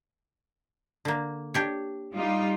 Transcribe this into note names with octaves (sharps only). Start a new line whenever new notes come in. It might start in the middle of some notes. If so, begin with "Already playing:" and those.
D3 A#3
D4 G4 C#5
G3 D#4 F4